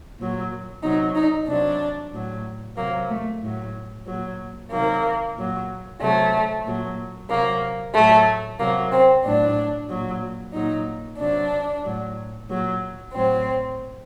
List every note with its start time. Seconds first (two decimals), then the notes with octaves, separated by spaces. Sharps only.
0.18 A#2 F#3
0.83 C3 F#3 D#4
1.15 D#4
1.47 C3 F#3 D4
2.13 A2 F#3
2.77 C3 F#3 A#3
3.09 A3
3.41 A2 F#3
4.07 A#2 F#3
4.72 C3 D#3 F#3 A#3
5.36 A#2 F#3
6.01 C3 F#3 A3
6.65 A#2 F#3
7.30 C3 F#3 A#3
7.95 A2 F#3 A3
8.59 C3 F#3 A#3
8.92 C4
9.25 A2 F#3 D4
9.89 A#2 F#3
10.54 A#2 F#3 D#4
11.19 C3 F#3 D4
11.84 A2 F#3
12.48 A#2 F#3
13.13 A2 F#3 C4